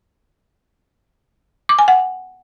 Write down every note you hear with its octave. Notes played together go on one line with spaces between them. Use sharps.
D6
G#5
F#5